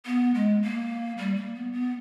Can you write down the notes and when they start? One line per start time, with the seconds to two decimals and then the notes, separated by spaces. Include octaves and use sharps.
0.06 B3
0.35 G#3
0.62 A#3
1.18 G3
1.36 A#3
1.55 B3
1.73 B3